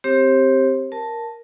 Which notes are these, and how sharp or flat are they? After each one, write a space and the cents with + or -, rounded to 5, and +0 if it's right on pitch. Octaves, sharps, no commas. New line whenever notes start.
C4 +0 G4 +0 C5 +40
A#4 +0 A5 +0